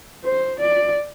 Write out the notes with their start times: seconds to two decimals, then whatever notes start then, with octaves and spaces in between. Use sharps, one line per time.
0.25 C5
0.60 D5